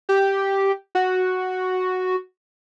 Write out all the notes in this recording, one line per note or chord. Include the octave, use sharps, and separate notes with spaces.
G4
F#4